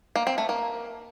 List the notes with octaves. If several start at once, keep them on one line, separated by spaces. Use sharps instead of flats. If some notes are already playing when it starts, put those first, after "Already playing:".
A#3
C4
A3
A#3